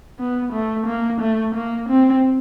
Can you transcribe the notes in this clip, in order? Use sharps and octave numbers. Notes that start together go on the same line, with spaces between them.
B3
A3
A#3
A3
A#3
C4